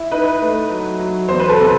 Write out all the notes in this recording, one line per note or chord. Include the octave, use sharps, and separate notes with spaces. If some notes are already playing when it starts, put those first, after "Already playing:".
Already playing: E4
D#4 B4
A3
F#3
F#3
E2 C5
B4
A4
C3 B4